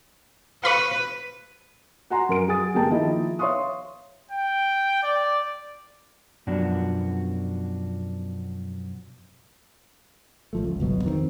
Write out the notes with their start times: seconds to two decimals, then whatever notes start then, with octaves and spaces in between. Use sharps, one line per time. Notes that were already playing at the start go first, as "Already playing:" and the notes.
0.64 B4 F5 B5 C#6
2.10 F#4 F#5 G#5 A#5 C6
2.29 F#2 A#4 D7
2.47 F#3 G#4 G#5 D#6 A6
2.74 G1 G#3 A#3 G4 G5 A5
2.90 D#3 F3 A#3 E4 G#4 D#5
3.39 C#5 E5 F5 C6 C#6 D#6
4.31 G5
5.03 D5
6.47 F#2 B2 F3 D4 F#4
10.53 G#1 F3 A3
10.64 C#2
10.80 G1 C2 B2 F#3
11.05 F2 D#3 A#3 C4